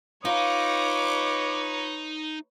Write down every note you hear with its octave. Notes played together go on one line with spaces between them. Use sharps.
D#4 F4 B4 C#5 D6